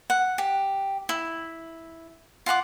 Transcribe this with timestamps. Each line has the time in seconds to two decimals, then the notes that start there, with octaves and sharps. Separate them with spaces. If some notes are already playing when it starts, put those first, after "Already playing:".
0.10 F#5
0.38 G4
1.09 E4
2.46 F4 F5 F#5 D6